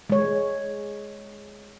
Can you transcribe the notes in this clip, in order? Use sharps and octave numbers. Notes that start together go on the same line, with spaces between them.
G#3 C#5